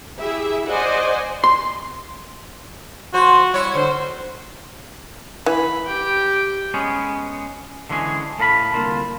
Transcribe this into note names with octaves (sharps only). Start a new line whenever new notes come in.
E4 G4 G#4 E5
C5 D5 D#5 F#5 G#5
C6
F3 F#4 C5
G3 E4 C#5
D3 C5
E3 B5
G4 G5
G#3 B3 C#4 G#4
D3 E3 G#3 C#4 G#4
A2 A4 F5 A#5 B5
C2 D3 A#3 F4